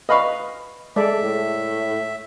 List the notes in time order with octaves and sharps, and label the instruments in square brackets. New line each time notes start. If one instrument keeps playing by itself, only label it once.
[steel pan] B4 F5 [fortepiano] D#5 B5 C#6
[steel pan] G#3 A4 D5 [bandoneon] E5
[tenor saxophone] A2